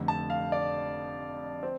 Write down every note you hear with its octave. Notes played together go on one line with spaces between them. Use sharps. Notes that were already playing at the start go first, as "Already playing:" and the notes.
Already playing: F1 F2 D3 A3
A5
F5
D5
C4